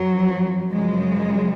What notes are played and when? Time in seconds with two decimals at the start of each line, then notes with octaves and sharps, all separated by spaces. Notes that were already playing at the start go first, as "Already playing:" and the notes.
Already playing: F#2 F3 F#3
0.70 F#2 C#3 F3 G#3